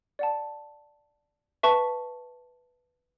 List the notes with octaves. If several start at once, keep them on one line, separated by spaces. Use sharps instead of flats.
D5 F#5 A5
B4 E5 A5 C#6